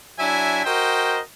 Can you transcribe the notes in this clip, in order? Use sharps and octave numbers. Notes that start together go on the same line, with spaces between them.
F#3 D4 E4 E5 G#5
F#4 A#4 C5 D#5 G5